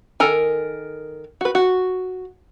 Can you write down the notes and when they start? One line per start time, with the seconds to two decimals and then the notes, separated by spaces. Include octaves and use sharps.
0.20 D#3 A4 A#4 G#5
1.41 F#4 B4
1.55 F#4